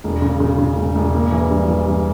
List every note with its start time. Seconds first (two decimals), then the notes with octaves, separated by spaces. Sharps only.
0.04 E1
0.22 C#3
0.40 C#3
0.58 C#3
0.77 E1
0.95 E1
1.14 A#3
1.32 E3
1.51 G2
1.68 E3
1.87 G2